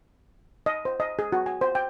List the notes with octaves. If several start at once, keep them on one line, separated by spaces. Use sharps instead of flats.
D#5
C5
D#5
G#4
F#4
G#5
C5
G5